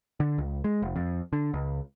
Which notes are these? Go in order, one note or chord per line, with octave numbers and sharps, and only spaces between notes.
D3
C#2
G#3
F1
F2
D3
C#2